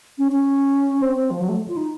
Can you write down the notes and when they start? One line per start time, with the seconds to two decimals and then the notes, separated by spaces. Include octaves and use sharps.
0.18 C#4
0.32 C#4
1.02 C4
1.16 C4
1.31 F3
1.40 F#3
1.49 A3
1.68 F4
1.77 D#4